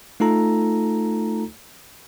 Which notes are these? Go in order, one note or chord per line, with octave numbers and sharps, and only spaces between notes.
A3 D#4 F4 A4 A#5